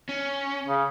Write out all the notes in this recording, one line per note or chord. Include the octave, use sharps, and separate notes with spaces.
C#4
C#3